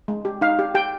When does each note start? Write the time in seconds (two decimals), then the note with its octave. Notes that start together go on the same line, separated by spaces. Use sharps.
0.08 G#3
0.25 G4
0.41 D#4 F5
0.59 G4
0.75 G4 G5